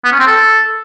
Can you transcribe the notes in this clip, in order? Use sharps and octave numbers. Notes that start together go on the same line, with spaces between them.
B3
C#4
C4
A4